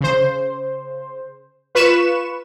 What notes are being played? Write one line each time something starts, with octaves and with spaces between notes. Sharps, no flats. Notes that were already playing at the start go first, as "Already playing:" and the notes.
C#3 C5
F4 B4 B5 C#6 E7